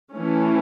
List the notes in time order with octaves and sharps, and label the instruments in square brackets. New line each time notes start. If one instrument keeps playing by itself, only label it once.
[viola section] E3 A3 C#4